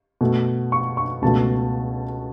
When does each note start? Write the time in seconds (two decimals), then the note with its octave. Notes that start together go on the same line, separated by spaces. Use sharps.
0.21 B2 A3
0.72 C#6
0.97 C#6
1.22 C#2 B2 A3 A5